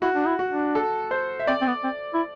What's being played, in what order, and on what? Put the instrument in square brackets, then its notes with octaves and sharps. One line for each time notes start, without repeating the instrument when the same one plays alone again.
[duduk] E4 [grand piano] F#4
[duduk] D4
E4
[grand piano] F#4
[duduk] D4
[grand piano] A4
C5
E5
[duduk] C4 [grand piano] D5
[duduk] C4
B3
C4
E4